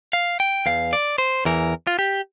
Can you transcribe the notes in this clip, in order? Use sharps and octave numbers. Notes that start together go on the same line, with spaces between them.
F5
G5
E2 E3 F5
D5
C5
E2 E3 A#4
F4
G4